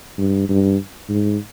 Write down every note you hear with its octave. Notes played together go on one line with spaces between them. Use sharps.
G2
G2
G#2